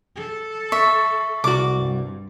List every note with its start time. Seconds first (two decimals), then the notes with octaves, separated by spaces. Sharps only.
0.15 A4
0.72 E5 C#6
1.44 C2 F#4 D6
1.75 G2